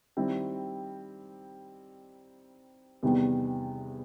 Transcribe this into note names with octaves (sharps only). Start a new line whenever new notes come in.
D#3 G3 C4 E4
E2 C3 D#3 G3 B3